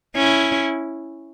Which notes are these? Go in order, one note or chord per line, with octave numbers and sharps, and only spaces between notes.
C#4 E4